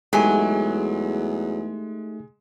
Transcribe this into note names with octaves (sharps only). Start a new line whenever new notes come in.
E2 F#3 G#3 A3 D#4 G4 G#5